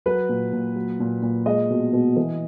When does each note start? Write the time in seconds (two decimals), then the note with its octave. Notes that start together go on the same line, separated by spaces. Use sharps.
0.06 F#3 B4
0.29 A#2
0.53 A#2
0.76 F#3
1.00 A#2
1.22 A#2
1.46 G#3 D#5
1.70 B2
1.93 B2
2.16 E3